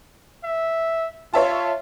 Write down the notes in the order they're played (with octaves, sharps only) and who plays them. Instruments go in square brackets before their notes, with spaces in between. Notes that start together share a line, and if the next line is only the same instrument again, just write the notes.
[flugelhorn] E5
[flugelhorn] F4 [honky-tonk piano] C#5 E5 A5